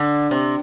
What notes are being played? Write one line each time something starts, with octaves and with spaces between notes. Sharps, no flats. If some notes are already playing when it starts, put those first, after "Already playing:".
Already playing: D3
C3